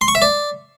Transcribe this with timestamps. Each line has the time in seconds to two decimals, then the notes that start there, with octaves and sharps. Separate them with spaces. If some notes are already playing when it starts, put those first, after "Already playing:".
0.01 C6
0.08 C#6
0.15 E5
0.22 D5